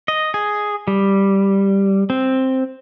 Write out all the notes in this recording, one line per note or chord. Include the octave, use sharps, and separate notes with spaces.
D#5
G#4
G3
C4